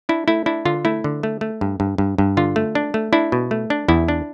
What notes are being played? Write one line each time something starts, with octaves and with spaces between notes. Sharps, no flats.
D4 E4
A3 E4
D4 E4
D3 F4
A3 E4
D3
A3
A3
G2
G2
G2
G2
D3 F4
A3
D4
A3
D4 E4
B2
A3
D4
E2 E4
D4